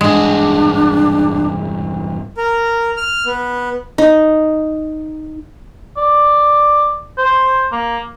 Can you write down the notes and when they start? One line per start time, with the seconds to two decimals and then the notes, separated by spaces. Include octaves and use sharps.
0.01 E2 G2 G#3 D4 F#4
2.37 A#4
2.97 F6
3.26 B3
3.98 D#4
5.97 D5
7.18 C5
7.72 A#3